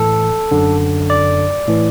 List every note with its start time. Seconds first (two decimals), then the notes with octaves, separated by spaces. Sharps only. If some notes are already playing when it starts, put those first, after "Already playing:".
Already playing: A2 E3 A4
0.51 F#2 D3
1.10 D5
1.68 A2 E3